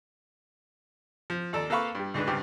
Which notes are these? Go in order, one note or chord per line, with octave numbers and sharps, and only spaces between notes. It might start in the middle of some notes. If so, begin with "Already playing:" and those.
F3
D#2 A4 D5 A#5
A#3 A4 B4 F5 B5 C#6
G2 G3
D2 G#2 G#3 D4 B4
C#2 G2 C4 G4